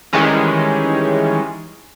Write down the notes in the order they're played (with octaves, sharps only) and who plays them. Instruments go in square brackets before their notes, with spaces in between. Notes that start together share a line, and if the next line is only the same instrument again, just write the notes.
[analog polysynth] D#3 E3 G3 G#3 C#4